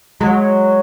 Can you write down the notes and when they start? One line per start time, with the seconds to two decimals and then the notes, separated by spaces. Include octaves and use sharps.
0.20 F#3 G#3